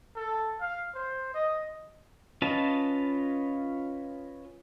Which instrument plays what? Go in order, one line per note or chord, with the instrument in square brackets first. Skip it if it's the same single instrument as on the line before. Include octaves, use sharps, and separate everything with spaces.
[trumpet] A4
F5
C5
D#5
[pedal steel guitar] C#4 F4 B4 D#5 A5